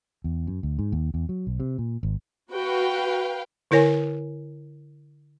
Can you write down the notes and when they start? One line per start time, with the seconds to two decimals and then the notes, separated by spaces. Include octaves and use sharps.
0.24 E2
0.47 F#2
0.63 D2
0.79 G#2
0.92 D#2
1.14 E2
1.29 F#3
1.47 B1
1.60 C3
1.78 A#2
2.03 G#1
2.52 F#4 B4 F5 G5
3.71 D3 E4 A#4 C#5 G#5